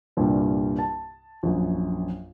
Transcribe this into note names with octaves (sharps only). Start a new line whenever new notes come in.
C2 G2 A#2
A5
A#1 F#2